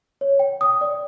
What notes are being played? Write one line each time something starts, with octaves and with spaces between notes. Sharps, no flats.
C#5
G5
D#6
D5